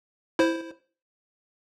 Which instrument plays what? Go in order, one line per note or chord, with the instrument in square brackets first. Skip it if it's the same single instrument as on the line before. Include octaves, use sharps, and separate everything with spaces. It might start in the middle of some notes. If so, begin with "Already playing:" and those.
[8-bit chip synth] E4 C5